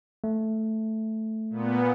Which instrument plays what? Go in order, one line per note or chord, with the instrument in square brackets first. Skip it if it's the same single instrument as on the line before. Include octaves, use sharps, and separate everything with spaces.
[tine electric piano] A3
[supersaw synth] A#2 B3